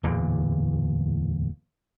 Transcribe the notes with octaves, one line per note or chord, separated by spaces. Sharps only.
D1 E2 A#2 D3